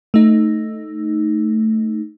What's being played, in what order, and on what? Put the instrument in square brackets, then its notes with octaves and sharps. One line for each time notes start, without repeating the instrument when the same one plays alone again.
[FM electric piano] A3 D#4